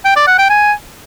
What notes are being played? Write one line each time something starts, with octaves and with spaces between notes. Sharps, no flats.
G5
D5
F#5
G5
G#5